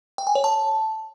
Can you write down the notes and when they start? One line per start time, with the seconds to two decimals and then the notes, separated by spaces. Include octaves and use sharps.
0.18 G5
0.27 G#5
0.35 C#5
0.44 A5